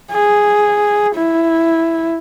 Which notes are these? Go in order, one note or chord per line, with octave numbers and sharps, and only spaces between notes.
G#4
E4